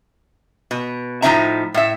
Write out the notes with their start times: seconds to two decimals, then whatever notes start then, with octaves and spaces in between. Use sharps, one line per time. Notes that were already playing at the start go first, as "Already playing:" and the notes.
0.71 B2
1.22 A2 F3 D4 D#4 E5 A#5
1.74 A2 E5